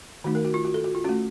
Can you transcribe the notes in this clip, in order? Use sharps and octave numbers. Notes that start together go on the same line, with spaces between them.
D#3 A3 D#4 F#4
A#4
F#4
F4
F#4
A4
F#4
F4
A3 C#4 F#4